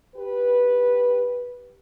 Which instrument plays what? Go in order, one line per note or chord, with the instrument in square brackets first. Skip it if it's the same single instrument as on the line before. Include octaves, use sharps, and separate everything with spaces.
[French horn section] G4 B4